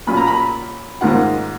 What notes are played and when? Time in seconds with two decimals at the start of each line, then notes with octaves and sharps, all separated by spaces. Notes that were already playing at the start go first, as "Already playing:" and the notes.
0.07 A#2 F#3 C#4 F4 B5
0.17 A#5
0.27 B5
1.01 G#2 D#3 A#3 C#4 F4 F#5